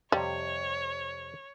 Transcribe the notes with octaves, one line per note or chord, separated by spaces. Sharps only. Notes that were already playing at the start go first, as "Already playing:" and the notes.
F2 C3 G3 C#5